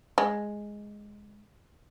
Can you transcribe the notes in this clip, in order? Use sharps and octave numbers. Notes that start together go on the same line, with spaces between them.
G#3